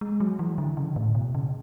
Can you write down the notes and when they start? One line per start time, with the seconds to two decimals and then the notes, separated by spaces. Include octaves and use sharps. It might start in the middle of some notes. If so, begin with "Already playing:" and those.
0.01 G#3
0.20 F#3
0.39 E3
0.58 D3
0.77 C#3
0.96 A2
1.15 B2
1.35 C#3